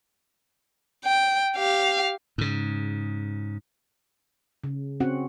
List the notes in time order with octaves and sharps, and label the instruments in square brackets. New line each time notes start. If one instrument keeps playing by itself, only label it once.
[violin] G5
G4 F5
[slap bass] G#2 C#3
[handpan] C#3
C4 C#4 F#4 F#5